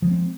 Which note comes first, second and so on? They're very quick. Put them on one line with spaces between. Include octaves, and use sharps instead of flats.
F3 G#3 C4